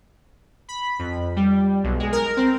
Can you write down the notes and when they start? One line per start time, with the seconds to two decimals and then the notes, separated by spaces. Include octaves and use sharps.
0.69 B5
0.99 F2
1.36 G3
1.84 B1
2.00 G#3
2.12 A#4
2.37 C4